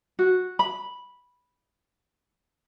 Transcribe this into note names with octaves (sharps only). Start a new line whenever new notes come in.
F#4
B5